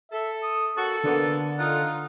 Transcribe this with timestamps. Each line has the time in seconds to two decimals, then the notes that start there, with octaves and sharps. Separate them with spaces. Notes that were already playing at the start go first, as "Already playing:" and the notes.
0.12 A4 E5
0.43 D#6
0.77 A#3 C#4 F#4 A4
1.03 D3 A#3 B3
1.58 D#4 F4 F#5